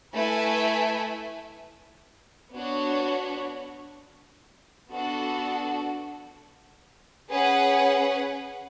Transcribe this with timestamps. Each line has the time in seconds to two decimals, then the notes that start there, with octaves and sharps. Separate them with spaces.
0.14 A3 E4 B4 E5 G#5
2.54 B3 D4 F#4 C#5
4.92 B3 D4 F#4 A4
7.30 C#4 G#4 B4 F#5